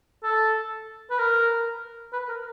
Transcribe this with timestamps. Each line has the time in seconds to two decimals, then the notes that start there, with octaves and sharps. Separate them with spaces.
0.23 A4
1.11 B4
1.19 A#4
2.13 B4
2.28 A#4